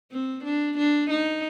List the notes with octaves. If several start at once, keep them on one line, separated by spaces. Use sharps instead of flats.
C4
D4
D4
D#4